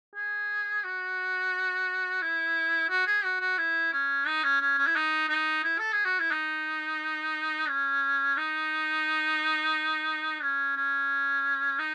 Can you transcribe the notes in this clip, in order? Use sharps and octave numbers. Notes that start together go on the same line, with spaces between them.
G#4
F#4
E4
F#4
G#4
F#4
F#4
E4
C#4
D#4
C#4
C#4
C#4
E4
D#4
D#4
E4
A4
G#4
F#4
E4
D#4
C#4
D#4
C#4
C#4
D#4